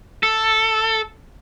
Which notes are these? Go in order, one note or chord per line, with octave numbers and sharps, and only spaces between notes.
A4